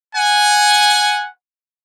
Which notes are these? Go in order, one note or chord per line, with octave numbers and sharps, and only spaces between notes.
F#5 G#5